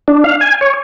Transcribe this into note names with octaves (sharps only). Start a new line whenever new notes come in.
D4
F5
G#5
C#5